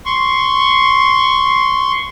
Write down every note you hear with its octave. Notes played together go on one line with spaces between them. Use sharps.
C6 C#6